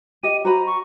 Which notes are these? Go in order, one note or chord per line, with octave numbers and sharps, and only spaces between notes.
G4 D#5 D#7
F#4 C5 A#5 B5
C#6